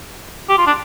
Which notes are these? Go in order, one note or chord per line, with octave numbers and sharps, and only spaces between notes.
G4
F4
D4